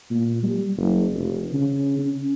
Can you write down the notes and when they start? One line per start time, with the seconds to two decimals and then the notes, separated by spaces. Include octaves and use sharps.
0.11 A#2
0.43 G3
0.77 F#1
1.14 F1
1.54 C#3
1.99 C#4